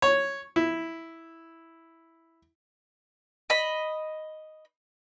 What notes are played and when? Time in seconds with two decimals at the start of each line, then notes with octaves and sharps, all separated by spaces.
0.02 C#5
0.56 E4
3.50 D#5 B5